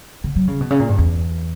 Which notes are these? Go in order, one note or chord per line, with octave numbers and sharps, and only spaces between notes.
D3
F#3
C#3
B2
C#3
A#2
G2
E2